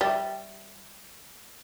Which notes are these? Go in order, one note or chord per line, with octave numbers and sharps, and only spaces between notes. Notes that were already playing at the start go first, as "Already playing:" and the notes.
G3 E5 G5